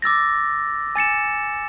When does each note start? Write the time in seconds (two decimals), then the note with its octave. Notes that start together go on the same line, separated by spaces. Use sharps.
0.02 D6 E6 A6 A#6
0.95 G#5 A6 C#7 E7